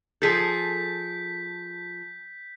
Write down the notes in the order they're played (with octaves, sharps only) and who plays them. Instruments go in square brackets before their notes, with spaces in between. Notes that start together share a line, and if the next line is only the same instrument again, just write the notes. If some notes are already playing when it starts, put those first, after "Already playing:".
[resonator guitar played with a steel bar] F3 G#4 A4 [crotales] G6 B6